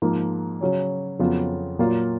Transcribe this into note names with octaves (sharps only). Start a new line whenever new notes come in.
G#2 F3 A#3
C#3 F#3 C#4
F2 C#3 F#3 B3 F4
A#2 F#3 A#3 F4